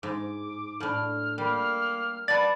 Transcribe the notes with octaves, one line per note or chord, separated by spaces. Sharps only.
G#2 D6
A2 D4 F6
G3 A#3
B4 D5 F#5 A5 A6